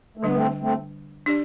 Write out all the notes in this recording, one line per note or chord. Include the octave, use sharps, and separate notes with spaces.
A3
D3 G3 B3 D4
A3 C4
A3 C4
D4 G4 D5